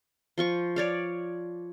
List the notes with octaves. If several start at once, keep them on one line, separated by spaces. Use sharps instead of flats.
F3 F4 C#6
C#5 D5 F5